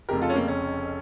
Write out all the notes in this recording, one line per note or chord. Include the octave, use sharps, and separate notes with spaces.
F1 F2 C#3 G4 A#4
F4 A4
C#4
A#3
C#4